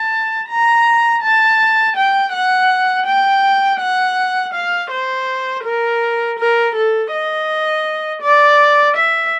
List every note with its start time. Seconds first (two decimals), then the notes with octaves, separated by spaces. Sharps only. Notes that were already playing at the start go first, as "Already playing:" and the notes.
Already playing: A5
0.49 A#5
1.23 A5
1.96 G5
2.33 F#5
3.06 G5
3.80 F#5
4.53 F5
4.90 C5
5.64 A#4
6.39 A#4
6.75 A4
7.12 D#5
8.22 D5
8.96 E5